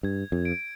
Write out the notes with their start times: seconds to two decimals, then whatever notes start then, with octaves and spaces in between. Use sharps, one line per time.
0.03 G2 G#6
0.32 F2
0.45 D7